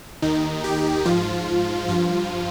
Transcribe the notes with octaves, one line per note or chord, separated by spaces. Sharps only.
D#2 D#3 D#4
G4
G#2 F3 F4
G2 F3 F4